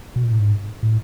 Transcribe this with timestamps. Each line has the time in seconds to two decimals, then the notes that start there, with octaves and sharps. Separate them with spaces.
0.16 B2
0.24 A#2
0.31 A2
0.39 G#2
0.83 A2